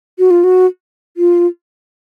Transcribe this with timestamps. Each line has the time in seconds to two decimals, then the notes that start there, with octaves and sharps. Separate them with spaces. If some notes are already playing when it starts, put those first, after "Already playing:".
0.19 F#4
0.31 F4
0.44 F#4
1.17 F4